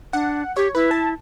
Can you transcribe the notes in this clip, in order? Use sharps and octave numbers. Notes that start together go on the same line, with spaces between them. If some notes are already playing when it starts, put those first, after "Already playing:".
D4 F#5
G4 C#5
E4 B4
A5